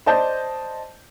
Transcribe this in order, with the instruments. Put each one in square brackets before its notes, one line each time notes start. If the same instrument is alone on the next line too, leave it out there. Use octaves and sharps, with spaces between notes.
[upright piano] C5 D5 D#5 A5 G6